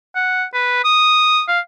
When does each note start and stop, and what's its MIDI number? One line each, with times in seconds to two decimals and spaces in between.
0.16 0.44 78
0.54 0.82 71
0.84 1.42 87
1.48 1.59 77